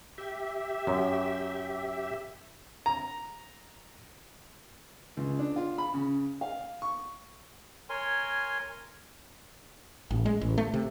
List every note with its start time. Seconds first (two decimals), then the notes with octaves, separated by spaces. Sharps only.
0.18 G4 E5
0.87 F#2
2.86 A#5
5.17 C#2
5.39 D4
5.56 F4
5.78 B5
5.94 C#3
6.41 F5
6.82 C#6
7.90 A#4 C#5 G#5 C6
10.11 A1
10.26 G#3
10.41 A1
10.58 A3
10.74 C3